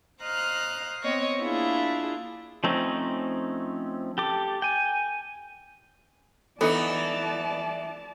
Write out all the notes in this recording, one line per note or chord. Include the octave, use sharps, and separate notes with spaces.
C5 D#5 F5 A#5 F#6
B3 C4 C#5 D#5
A#3 D4 E4 F4 G#4
F3 A3 C4 C#4 D#4
G4 A4 D6
G5 G#5
E3 B3 D#4 A4 D5 A5